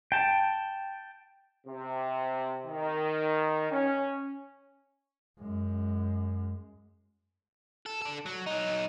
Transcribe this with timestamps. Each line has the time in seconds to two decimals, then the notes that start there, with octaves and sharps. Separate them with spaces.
0.12 G5 A5
1.67 C3
2.66 D#3
3.71 C#4
5.39 F#2 G#3
7.86 A4
8.02 D4 A4
8.26 F#3
8.46 F#3 D#4